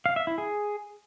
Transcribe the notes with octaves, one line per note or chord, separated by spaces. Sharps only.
F5
E5
E4
G#4